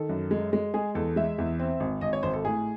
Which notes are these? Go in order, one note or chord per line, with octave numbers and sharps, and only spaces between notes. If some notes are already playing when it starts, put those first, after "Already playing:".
Already playing: D#3 A4
F#2
G#3
G#3
G#3 G#4
E2 A4
G#3 E5
E2
C4
G#1
G#1 D#5
C#5
G#1 C5
A4
A2 G#4